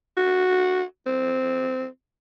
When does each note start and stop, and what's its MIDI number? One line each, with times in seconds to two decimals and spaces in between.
0.17 0.83 66
1.07 1.86 60